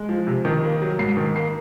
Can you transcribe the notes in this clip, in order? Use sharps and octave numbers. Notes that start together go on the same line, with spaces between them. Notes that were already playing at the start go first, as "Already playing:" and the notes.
Already playing: G#3
F3
C3
D#3
A#3
F#3
G#2 C7
D#3
A#3 C7